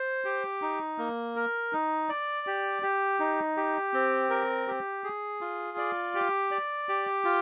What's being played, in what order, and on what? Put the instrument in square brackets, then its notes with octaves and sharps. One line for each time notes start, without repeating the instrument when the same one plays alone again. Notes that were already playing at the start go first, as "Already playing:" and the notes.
Already playing: [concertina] C5
G4
D#4
A#3
A#4
D#4
D5
G4
G4
D#4
G4
C4
A#4
G4
G#4
F4
D5
G4
D5
G4
F4